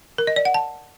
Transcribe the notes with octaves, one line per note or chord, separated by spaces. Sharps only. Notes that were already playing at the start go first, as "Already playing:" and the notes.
A#4
D#5
D5
F#5
A5